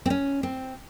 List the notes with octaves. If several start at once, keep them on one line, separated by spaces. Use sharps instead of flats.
C4
C#4
C4